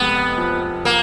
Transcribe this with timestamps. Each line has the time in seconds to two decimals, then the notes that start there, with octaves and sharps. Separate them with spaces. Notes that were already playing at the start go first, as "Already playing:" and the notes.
Already playing: F1 G#3 B3
0.38 F3
0.85 A#3